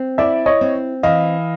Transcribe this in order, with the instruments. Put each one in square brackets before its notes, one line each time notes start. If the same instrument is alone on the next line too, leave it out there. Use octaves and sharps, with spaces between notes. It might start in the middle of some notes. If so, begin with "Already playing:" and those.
Already playing: [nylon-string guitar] C4
[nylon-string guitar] E4 [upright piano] D5 E5
[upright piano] C#5 D#5
[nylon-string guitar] C4
[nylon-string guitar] E3 [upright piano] D#5 F5